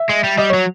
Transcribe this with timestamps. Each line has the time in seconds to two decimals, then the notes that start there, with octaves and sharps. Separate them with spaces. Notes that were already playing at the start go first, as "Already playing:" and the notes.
Already playing: E5
0.09 G#3
0.24 G3
0.38 G3 D#5
0.50 F#3 C#5